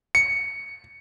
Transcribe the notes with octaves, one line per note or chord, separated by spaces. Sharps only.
C#7